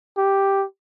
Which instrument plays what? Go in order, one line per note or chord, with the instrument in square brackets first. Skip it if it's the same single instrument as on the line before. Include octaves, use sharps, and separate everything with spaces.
[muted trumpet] G4